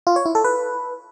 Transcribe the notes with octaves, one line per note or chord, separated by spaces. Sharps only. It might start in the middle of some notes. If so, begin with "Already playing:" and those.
F4
C#5
E4
A4
B4